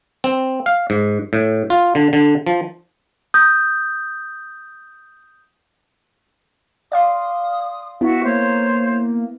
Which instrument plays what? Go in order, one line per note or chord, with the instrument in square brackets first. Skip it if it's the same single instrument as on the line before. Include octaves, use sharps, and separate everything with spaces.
[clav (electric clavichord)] C4
F5
G#2
A2
F4
D3
D3
F3
[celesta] D#6 G6
[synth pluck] D5 F5 C6 [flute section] D#6
[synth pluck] B3 E4 [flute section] F#4 E5
[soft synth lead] A#3 [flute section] C5 C#5